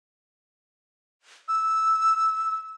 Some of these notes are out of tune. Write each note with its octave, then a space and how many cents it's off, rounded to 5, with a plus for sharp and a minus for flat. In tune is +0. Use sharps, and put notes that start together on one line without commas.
E6 -10